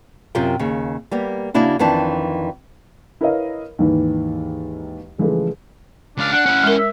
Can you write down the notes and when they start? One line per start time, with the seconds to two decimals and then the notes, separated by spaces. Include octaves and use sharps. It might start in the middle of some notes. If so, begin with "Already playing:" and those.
0.35 F#2 C3 F4 A#4 G5
0.59 D#2 C#3
1.11 G3 A#3 B3
1.54 C#3 A#3 D4 E4 F#4
1.79 F2 D#3 E3 D4 A5
3.21 E4 A#4 B4 C#5 D#5 F5
3.79 D#2 G#2 D#3 E3
5.18 C#3 E3 F3 G#3 A3
6.18 C#2 D4 F5
6.32 D4 F#5
6.46 C#4 E4
6.63 G#3 A#4
6.78 E5